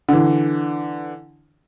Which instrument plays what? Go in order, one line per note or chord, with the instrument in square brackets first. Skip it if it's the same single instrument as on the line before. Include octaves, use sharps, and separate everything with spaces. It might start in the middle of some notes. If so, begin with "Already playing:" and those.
[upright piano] D3 E3